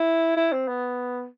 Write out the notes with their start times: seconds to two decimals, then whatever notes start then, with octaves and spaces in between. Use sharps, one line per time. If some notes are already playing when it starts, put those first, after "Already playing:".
Already playing: E4
0.37 E4
0.52 C4
0.67 B3